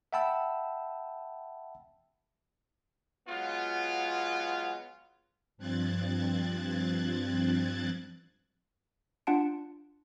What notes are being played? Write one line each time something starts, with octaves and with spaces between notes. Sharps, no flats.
E5 F#5 G5 A5 B5 E6
F#3 G#3 B3 F4
G2 F3 C4 F#6 G#6 A6
D4 F4 F#5 A5 D7